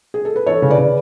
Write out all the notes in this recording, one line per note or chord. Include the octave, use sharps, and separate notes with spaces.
G#4
A4
B4
E3 A4 C#5
C#3
B4 D5
C#3